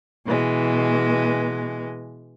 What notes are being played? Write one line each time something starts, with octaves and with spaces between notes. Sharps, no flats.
B2 E3 G#3